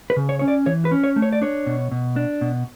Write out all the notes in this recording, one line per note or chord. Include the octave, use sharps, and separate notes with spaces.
B4
C#3
C#5
C#4 C#5
D5
E3 C#5
B4
C#4
C#5
A3
C#5
D5
D4 C#5
B2
B2
D4
B2